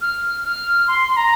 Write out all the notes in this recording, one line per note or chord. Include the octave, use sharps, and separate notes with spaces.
F6
F6
C6
A#5